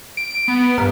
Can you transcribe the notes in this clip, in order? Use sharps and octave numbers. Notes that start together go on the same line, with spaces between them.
D7
D7
B3
G2 A#4